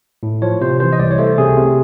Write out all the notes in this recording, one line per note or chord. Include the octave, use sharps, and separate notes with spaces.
A2
F3 C#5
C3 C5
E3 C5
D#5
C2 D5
C#5
A3 C5
C3 G#4
C3